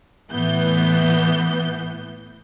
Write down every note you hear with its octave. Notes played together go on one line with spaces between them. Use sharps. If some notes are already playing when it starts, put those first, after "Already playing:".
A2 E3 B3 G6